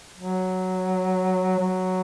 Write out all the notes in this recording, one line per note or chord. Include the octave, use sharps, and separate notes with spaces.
F#3
F#3